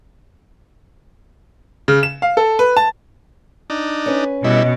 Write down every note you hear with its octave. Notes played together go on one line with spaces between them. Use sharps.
C#3
E7
F5
A4
B4
A5
D4 D#4
C#4 B4
B2 G3 E4 D#5